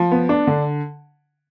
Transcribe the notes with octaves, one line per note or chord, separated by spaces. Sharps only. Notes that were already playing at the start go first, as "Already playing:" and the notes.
Already playing: F3
B3
D4
D3